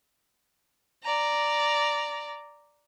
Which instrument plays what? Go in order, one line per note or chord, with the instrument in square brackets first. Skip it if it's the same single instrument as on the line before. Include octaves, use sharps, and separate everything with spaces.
[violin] D5 A#5